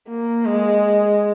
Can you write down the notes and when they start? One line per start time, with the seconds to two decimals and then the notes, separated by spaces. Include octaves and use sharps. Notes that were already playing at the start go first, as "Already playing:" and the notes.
0.08 A#3
0.46 G#3